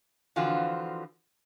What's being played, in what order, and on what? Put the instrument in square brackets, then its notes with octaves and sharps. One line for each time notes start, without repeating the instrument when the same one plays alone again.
[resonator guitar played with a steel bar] D3 E3 F3 C4 F4 F#4